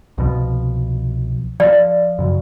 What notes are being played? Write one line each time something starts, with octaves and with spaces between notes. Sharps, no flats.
C2 B2 F3
F3 D5
F#2 C#3